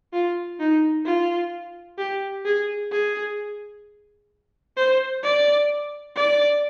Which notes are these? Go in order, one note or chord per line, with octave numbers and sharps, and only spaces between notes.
F4
D#4
F4
G4
G#4
G#4
C5
D5
D5